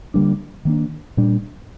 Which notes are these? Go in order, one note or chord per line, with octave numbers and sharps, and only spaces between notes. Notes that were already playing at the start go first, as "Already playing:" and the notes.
D3 G3 A#3 D4
D#3 A#3 D4
A#2 G3 D4